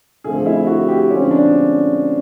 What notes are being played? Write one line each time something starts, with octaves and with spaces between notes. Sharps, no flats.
D3 F3 A3 C4 G#4
E4
F#4
G4
D3 F3 G#3 C4 C#4
D4